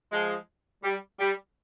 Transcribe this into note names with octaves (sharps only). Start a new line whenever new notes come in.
F3 G#3
G3
G3